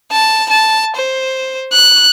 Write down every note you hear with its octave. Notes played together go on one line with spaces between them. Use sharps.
A5
A5
C5
F#6